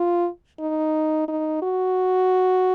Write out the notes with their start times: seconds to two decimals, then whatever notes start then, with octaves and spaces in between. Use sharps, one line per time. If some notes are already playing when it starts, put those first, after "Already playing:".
Already playing: F4
0.60 D#4
1.28 D#4
1.62 F#4